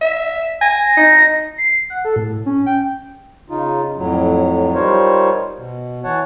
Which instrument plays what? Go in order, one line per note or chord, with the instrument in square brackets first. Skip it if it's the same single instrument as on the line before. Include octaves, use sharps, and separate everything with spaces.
[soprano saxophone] E5
[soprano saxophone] G#5 [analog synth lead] A#6
[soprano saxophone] D#4
[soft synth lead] C7
F#5
A4
A2
C#4
G5
[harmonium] C#3 D#4 F4
F2 A2 F#3
G3 D#4 F4 A#4 C5 C#5
B2
E3 C#5 F#5 A5